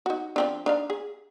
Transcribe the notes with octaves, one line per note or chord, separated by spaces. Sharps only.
D#4 F#4
F3 C4 D4
D4 D#4 F5
G#4